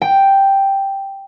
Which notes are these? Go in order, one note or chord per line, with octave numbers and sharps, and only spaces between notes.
G5